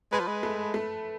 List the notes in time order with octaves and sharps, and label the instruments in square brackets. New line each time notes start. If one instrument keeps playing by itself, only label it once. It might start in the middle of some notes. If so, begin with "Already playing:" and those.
[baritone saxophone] G#3 [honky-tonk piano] B4
[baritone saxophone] F3
G#3
[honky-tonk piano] A3
A3